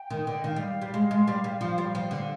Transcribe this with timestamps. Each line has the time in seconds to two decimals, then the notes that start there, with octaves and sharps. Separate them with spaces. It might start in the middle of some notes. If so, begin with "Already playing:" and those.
Already playing: G5
0.10 D#3
0.27 D3
0.37 D#5
0.44 D#3 F5
0.56 G3
0.82 G3
0.94 G#3
1.11 G#3
1.27 G3
1.44 G3
1.61 F3
1.78 G3
1.95 F3
2.11 D3